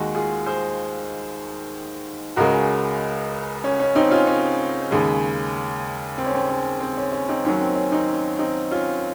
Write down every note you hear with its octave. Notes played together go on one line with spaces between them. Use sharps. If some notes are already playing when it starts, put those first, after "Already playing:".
Already playing: D#2 D#3 G#3 D#4 F#4
F4 G#4
G#4 C5
C#2 C#3 G#3 F#4 A#4
C#4
C#4
C4 D#4
C#4 F4
C#4
D#2 C#3 G#3
C4
C#4
C4
C#4
C4
C#4
C#4
C4 D#4
D#2 D#3 F#3 C#4
C4
C#4
C4 D#4
C#4
C4 D#4
C#4 F4